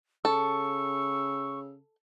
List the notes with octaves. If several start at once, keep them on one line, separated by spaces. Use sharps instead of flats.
C#3 A4 C#6 E6